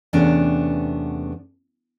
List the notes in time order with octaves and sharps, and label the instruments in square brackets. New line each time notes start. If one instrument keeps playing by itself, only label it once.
[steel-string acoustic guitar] E2 C3 A3 B3 C#4 D4